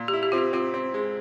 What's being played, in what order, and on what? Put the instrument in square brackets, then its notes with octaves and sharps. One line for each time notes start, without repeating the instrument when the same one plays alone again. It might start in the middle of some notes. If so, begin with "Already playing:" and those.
Already playing: [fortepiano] A#2
[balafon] G4
[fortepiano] E4
[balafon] G4
[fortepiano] C4 [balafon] F4
[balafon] G4
[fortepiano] C4 [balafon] F4
[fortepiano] C4
G#3